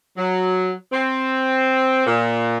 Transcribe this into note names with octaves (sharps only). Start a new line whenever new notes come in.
F#3
C4
A#2